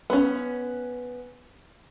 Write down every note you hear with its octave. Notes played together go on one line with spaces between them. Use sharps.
B3 C#4